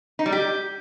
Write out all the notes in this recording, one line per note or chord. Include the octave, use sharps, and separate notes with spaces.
D#4
G3
G4